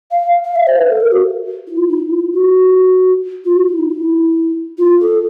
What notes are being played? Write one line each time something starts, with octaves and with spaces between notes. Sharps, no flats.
F5
F5
E5
C5
B4
A4
A#4
F#4
E4
F4
D#4
E4
F4
F#4
F4
F#4
E4
D#4
E4
F4
A4